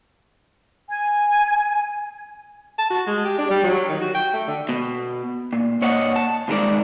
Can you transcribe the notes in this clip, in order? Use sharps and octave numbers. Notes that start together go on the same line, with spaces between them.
G#5
A5
F#4
G#3
G4
D4
G3
F#3
D#3
F#4
G5
A3
D3
B2
A#2
A#2 C#5 D#5 F#5
A5
C2 D#3 G#3 F#4 A#4 D5